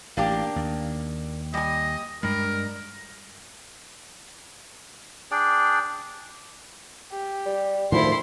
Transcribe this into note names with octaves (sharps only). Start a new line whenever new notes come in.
A1 A#3 D4 G4
D#2
G3 D#5 G#5
G2 G3 G#3 A#4
D4 G#4 D5 G5
G4
G3
D2 A2 D#3 F3 E4 C6